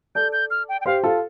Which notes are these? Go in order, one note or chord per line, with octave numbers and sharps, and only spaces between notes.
A4 D5 G6
G6
F6
G5
G5
G4 C5 F5
F4 A4